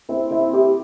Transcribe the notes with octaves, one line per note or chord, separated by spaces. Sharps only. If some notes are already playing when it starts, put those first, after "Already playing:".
C4 E4
C4 E4
E4 G4